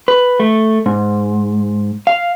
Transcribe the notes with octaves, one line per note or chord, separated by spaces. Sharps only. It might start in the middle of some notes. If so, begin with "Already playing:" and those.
B4
A3
G#2
F5